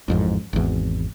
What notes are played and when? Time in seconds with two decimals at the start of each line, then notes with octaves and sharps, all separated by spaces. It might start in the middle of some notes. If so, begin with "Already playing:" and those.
0.08 A1 F2 G#2
0.53 G#1 E2